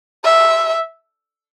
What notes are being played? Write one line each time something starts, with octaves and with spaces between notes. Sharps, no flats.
E5